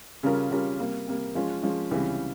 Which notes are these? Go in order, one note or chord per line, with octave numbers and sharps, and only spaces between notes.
C#3 G3 C#4 F4 A#4
C#3 G3 C#4 F4 A#4
C3 G3 A#3
C3 G3 A#3
F3 G#3 C#4 F4
F3 G#3 C#4 F4
C#2 C3 E3 G3 C#4